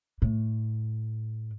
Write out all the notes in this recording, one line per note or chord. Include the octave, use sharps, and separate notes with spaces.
A2